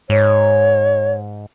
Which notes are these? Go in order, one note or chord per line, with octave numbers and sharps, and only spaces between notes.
G#2 C#5